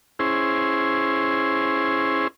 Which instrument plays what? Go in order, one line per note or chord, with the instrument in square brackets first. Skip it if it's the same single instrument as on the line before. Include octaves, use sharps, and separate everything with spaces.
[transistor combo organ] C#4 E4 G#4 C5